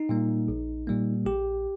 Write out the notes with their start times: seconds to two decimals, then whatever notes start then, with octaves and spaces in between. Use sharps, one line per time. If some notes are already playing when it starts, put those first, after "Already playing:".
Already playing: D#4
0.09 A#2 G3 A#3
0.48 A#1
0.87 A#2 G3 A#3
1.26 A#1 G4